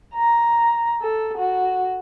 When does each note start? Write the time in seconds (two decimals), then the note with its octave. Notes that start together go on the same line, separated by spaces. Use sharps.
0.15 A#5
1.01 A4
1.38 F#4